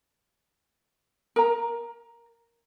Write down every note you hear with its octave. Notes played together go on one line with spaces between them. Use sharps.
A#4 A#5